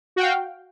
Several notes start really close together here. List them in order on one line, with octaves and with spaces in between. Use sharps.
F#4 G5 F5